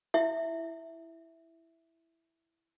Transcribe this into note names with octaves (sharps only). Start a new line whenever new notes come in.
E4 E5